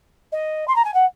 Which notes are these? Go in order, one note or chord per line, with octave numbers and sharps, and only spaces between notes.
D#5
C6
A#5
G#5
F#5